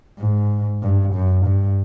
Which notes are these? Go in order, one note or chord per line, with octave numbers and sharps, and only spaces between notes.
G#2
G2
F#2
G2